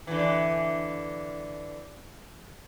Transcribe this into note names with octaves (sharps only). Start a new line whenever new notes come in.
D3 E3